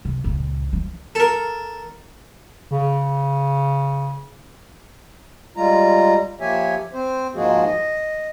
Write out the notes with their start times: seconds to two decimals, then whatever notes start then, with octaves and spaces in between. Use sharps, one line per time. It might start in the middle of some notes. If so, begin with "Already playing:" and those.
0.05 C3
0.24 C#2 A#2
0.73 F3 A3
1.15 A4 A#4
2.71 C#3
5.57 G3 G#3 F4 A#5
6.41 F3 A#3 G4 C#5 E5 G#5
6.93 C4 C5
7.35 G#2 F3 G#3 A#3 F#4 G#4
7.65 D#5